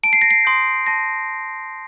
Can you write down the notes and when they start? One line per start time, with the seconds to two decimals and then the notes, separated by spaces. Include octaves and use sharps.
0.03 A5 D7
0.13 C7
0.22 A#6
0.31 C7
0.45 C6 D#6 G6
0.87 A5 A#6